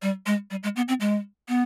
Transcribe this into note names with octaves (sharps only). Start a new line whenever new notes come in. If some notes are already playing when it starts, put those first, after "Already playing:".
G3
G#3
G3
G#3
B3
C4
G#3
B3